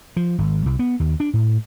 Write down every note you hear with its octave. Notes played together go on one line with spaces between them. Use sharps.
F3
G#1
C2
B3
D#2
D4
A2